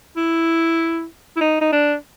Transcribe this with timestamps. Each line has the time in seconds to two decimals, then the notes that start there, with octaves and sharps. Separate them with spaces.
0.17 E4
1.36 E4
1.41 D#4
1.61 D#4
1.72 D4